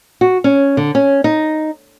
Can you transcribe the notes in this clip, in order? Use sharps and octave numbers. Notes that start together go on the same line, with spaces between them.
F#4
C#4
D3
C#4
D#4